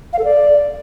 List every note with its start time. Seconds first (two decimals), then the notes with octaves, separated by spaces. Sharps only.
0.13 F5
0.19 A4
0.24 D5